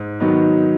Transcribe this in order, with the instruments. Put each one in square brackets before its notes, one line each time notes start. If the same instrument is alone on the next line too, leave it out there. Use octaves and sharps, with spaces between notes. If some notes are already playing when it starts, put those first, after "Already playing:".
Already playing: [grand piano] G#2
D#3 F#3 B3 D#4